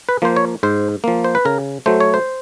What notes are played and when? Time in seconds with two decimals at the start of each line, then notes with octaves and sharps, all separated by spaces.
0.09 B4
0.22 F3 A#3 C5
0.36 C#5
0.63 G#2 C5
1.04 F3 A#3
1.24 C5
1.35 B4
1.45 C#3 A#4
1.86 F#3 A3 C5
2.00 C#5
2.14 C5